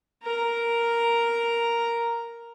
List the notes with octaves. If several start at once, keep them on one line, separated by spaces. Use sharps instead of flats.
A#4 A#5